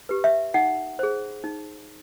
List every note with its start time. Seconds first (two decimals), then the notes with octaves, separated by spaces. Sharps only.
0.09 G4 B4
0.24 E5
0.54 D#4 F#5
0.99 G#4 C5
1.44 D#4